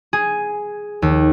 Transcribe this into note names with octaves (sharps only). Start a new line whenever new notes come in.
G#4
D#2